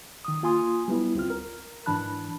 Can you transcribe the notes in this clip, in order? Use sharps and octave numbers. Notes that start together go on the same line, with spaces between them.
D#3 D#6
A#3 F4 G#5 C6 D#6
G3 B3 E4
D2 C4 F4 F6
A#4
G#2 E3 D4 A5 B5 F#6